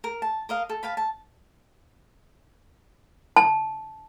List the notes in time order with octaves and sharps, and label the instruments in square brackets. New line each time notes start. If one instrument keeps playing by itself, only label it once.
[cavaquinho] A#4
A5
A#4 D#5 F5
A4
B4 F5 A5
A5
[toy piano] A5